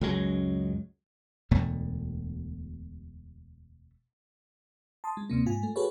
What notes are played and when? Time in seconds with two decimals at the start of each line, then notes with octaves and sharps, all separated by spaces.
0.01 C#2 F#2 F#3 G#3
1.51 E1 D2 B2 A3
5.04 A5 C6 D#6
5.17 G#3
5.30 D2 C3 A#3
5.46 G#2 F4 G#5
5.63 A3
5.76 F#4 G#4 A4 B4 C#5